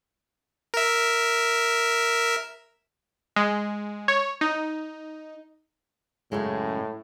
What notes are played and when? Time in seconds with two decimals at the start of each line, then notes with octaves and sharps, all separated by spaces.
0.74 A#4 E5
3.36 G#3
4.08 C#5
4.41 D#4
6.32 F#2 A2 C#3 G#3